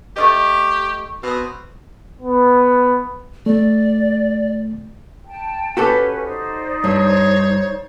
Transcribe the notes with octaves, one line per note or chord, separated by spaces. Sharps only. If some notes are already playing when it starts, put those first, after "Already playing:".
A3 C#4 G4 D#5
B2 C4 D#6
B3
A3 D5
G5 A5
C#4 F#4 G4 A4 B4
D#4 C5 D5
G2 C#5